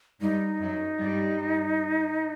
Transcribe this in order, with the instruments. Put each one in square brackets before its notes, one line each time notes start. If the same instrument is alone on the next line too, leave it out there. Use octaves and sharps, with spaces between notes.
[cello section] G2 G3 [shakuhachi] D#4
[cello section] F#2 F#3
G2 G3